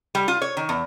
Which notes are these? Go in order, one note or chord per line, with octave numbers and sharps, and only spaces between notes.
G3
F4
C#5
D#3
E2